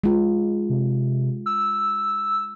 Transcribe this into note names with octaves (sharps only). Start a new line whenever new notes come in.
G#3 F4
C3
E6